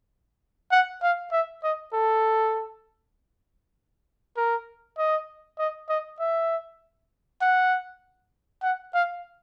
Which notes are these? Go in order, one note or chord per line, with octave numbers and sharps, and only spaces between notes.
F#5
F5
E5
D#5
A4
A#4
D#5
D#5
D#5
E5
F#5
F#5
F5